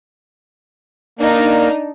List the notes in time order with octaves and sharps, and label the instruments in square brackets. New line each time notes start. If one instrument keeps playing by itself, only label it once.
[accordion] A#3 [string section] D4 D#4